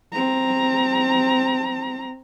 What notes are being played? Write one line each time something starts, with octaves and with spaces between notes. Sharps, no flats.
C4 A#5